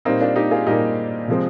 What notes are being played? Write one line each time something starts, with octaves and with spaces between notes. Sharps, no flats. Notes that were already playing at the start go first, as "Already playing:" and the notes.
A#2 G3 A#3 C4 D#4
D4 F4
D#4 G4
F4 G#4
A#2 G3 A#3 D#4 G4
C3 F3 G#3 C4